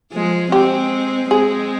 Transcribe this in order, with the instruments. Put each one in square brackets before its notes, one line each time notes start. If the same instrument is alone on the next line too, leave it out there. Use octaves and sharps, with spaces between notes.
[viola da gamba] F3 G#3
[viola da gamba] G#3 C4 [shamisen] G4
[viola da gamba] G#3 C4 [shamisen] G#4